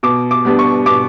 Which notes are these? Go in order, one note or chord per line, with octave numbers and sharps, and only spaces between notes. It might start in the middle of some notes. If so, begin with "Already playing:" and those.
B2 D6
D6
G3 B3 D4
C#6
B2 D6